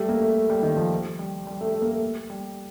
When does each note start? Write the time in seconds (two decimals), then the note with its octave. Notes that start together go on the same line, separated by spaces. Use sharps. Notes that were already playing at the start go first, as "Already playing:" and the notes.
Already playing: G3 A3
0.09 A#3
0.21 A3
0.50 G3
0.63 D#3
0.77 F3
1.19 G3
1.47 G3
1.61 A3
1.75 A3
1.82 A#3
1.88 A3
2.30 G3